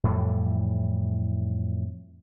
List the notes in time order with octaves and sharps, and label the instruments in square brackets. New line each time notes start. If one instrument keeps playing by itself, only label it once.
[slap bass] F2 A2 E3 G3